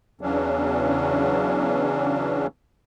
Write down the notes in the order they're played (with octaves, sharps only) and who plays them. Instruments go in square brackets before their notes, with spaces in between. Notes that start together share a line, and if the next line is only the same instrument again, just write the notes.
[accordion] E2 C#3 E3 F#3 C#4 D4